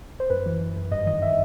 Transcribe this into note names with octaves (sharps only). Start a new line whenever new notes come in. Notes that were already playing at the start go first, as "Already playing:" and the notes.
C5
F#2 B4
E3
E3
F#2
G2 D#5
D#3 D#5
D#3 E5